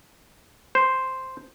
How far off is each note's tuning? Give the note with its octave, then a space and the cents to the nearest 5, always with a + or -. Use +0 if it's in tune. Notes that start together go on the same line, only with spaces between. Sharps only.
C5 +0